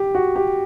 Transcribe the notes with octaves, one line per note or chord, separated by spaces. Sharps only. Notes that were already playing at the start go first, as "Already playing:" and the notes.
Already playing: G4
F#4
G4